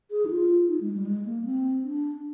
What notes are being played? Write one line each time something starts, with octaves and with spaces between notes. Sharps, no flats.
G#4
D#4
F4
D#4
G#3
G3
G#3
A#3
C4
D4